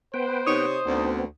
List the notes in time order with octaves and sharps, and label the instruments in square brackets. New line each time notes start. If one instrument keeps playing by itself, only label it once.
[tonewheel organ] B3 B4 G5 [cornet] C5
[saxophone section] C3 C#5 [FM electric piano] D#4 D#6
[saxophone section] D2 [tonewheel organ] B3 C4